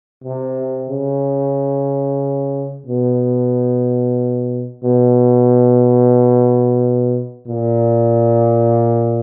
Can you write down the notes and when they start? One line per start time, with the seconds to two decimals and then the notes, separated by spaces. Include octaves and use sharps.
0.24 C3
0.89 C#3
2.86 B2
4.84 B2
7.47 A#2